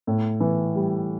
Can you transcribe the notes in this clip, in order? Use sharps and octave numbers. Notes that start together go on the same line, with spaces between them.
A2
E3
G3